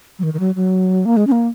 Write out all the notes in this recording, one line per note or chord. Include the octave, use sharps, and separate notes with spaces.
F#3
D#3
D#3
F#3
F#3
A#3
G#3
C#4
A#3